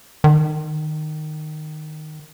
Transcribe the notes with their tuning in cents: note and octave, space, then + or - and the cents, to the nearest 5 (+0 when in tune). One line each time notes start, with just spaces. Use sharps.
D#3 -15